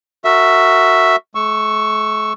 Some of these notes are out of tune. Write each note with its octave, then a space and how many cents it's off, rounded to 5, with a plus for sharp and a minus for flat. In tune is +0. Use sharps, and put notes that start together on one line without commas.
F#4 +0 A#4 -30 E5 +0
A3 -45 C#6 +0 E6 +0